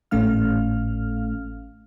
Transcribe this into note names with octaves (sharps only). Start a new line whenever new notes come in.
G#1 A2 A3 C#4 F5 F6